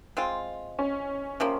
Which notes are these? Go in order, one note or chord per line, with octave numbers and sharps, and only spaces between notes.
G#3 C4 F4
C#4
C3 F3 A#3 C#4